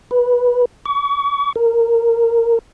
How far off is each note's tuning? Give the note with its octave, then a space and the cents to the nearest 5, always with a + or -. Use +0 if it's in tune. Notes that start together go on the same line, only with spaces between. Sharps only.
B4 -15
C#6 +40
A#4 -10